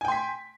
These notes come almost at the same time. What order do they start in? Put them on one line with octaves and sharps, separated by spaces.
G#5 G5 C6 B6